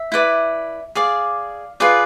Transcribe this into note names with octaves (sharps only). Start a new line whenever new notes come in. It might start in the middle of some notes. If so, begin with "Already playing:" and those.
Already playing: E5
E4 B4 D5
G#4 D5 F5
F4 G#4 B4 D5